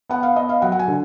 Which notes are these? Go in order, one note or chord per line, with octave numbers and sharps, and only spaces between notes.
B3 F#5
F5
B3 D#5
F5
F#3 F#5
F#5
G#5
D3